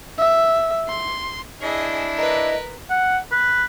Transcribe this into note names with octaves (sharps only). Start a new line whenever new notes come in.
E5
C6
D4 E4 G#4 D#5
A#4 B4 D#5
F#5
B4